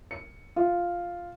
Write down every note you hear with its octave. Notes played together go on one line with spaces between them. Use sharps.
C#7
F4